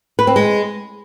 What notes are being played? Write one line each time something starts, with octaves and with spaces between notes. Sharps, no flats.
B4
C4
G#3